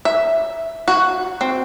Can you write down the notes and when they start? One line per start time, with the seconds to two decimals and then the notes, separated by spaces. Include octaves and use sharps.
0.05 E5
0.88 F#4
1.41 C4